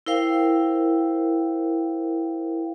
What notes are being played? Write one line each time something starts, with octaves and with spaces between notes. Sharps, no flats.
E4 A#4 C5 F5 G5